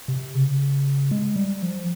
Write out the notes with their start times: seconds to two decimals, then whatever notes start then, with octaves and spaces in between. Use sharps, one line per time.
0.08 C3
0.35 C#3
1.11 G#3
1.36 G3
1.62 F3